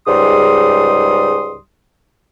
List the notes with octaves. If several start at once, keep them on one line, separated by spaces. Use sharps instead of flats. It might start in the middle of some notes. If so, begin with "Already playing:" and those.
C#2 G#2 G3 C6 D#6